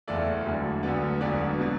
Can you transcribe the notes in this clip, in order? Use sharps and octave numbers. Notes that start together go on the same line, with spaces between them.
F#1 E2 E3 A3 D5
E1 D2 D3 F#3
D2 D3 F#3 B3 D5
E1 D2 D3 F#3 B3 D5
B2 F#3